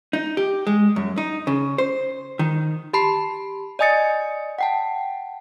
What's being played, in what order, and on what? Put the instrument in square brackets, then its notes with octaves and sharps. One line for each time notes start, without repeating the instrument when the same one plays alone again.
[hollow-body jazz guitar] D#4
G4
G#3
F#2
D#4
C#3
C5
D#3
[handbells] G4 A5 B5 C6 C7
D5 D#5 G#5 D#6 A6 C#7
F#5 G5 A5